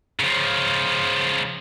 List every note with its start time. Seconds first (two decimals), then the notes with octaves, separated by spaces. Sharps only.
0.20 C#3 F3